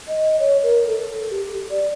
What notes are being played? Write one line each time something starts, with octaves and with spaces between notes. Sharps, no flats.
D#5
C#5
A#4
A4
G4
D5